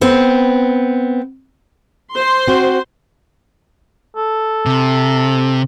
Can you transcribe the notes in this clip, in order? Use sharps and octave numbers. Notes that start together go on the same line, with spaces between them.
B3 C4
C5 C6
C4 F#4
A4
C3